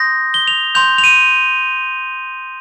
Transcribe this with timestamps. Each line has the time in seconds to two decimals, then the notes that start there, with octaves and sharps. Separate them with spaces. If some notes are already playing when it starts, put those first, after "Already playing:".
Already playing: C6 D#6 G6 A#6
0.34 G7
0.48 F7
0.75 C6 G6 F7
0.98 F7
1.04 D#7